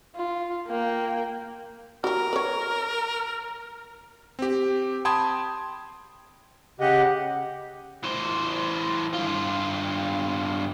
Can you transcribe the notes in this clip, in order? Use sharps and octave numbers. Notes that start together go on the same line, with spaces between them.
F4
A#3 G5
F#4 G4 A#4
B4 C#5
C4 G4
G5 A5 B5 C6 D#6 G#6
C#3 G4 D#5 F#5
E3 C5
G2 F4